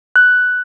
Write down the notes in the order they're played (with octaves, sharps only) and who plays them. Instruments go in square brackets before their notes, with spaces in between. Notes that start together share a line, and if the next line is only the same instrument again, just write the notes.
[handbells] F#6